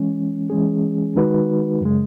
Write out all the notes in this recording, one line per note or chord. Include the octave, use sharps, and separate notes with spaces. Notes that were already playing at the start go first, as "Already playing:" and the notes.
Already playing: E3 G#3 C#4
E3 G#3 C#4 G#4
D#3 G#3 D#4 F#4 B4
F#2 C#3 G#3